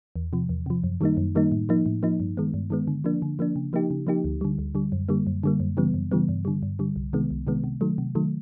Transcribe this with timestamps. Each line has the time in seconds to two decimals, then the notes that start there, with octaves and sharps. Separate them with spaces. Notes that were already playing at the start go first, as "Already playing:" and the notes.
0.16 E2
0.33 C3 F3
0.49 E2
0.66 C3 F3
0.84 F#2
1.01 D#3 G3 A#3 D#4
1.17 F#2
1.35 D#3 G3 A#3 D#4
1.52 A2
1.69 F3 A#3 D#4
1.86 A2
2.03 F3 A#3 D#4
2.20 G2
2.37 D#3 G#3 B3
2.54 G2
2.70 D#3 G#3 B3
2.87 D3
3.04 F3 A#3 D4
3.22 D3
3.39 F3 A#3 D4
3.56 C#3
3.73 F3 A#3 D#4 G4
3.91 C#3
4.07 F3 A#3 D#4 G4
4.24 D2
4.41 D3 G3
4.59 D2
4.75 D3 G3
4.92 F#2
5.09 D3 G3 A#3
5.27 F#2
5.43 D3 G3 A#3
5.60 F#2
5.77 C#3 E3 G3 B3
5.94 F#2
6.11 C#3 E3 G3 B3
6.29 G2
6.45 D3 G3
6.63 G2
6.79 D3 G3
6.96 C2
7.13 C3 D#3 G#3 B3
7.30 C2
7.47 C3 D#3 G#3 B3
7.64 C3
7.81 D#3 F#3 A3
7.98 C3
8.15 D#3 F#3 A3